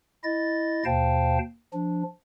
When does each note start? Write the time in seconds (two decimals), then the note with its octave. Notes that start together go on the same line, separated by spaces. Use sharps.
0.24 E4 D#5 A6
0.85 D#2 B2 C5 F5 G5 A5
1.74 F3 D4